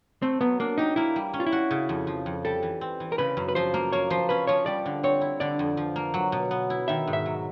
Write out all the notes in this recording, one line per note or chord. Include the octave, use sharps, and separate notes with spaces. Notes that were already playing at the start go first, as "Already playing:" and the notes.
A3 C4
F#3 B3
A#3 D4
D#4 G4
A#3 E4
G3
C#4
F4
E4
F#4
C#3
F2
F3
F2
G3 A4
E3
C4
E3
A#4
C#3 B4
F#2
B4
F3 C5
A#3
A#3 C#5
F3 C5
C#4 B4
F3 C#5
G3 D5
D3
C4 C#5
E4
D3 D5
F2
F3
A#3
F#3
B2
B3
E4
D#3 E5
G#2
E5
F#3